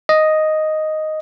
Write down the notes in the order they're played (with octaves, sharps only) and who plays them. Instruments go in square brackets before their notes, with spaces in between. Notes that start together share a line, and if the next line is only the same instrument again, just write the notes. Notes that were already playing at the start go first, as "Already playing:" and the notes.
[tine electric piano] D#5